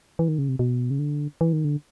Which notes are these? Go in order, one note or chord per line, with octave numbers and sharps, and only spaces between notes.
E3
D#3
C#3
C3
B2
C#3
D3
E3
D#3
D3